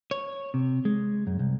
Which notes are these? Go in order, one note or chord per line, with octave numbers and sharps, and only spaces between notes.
C#5
C3
G#3
F#2
C2